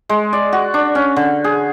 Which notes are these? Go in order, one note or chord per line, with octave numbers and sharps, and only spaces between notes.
G#3
D5
F#4
D4
C#4
D3
G#4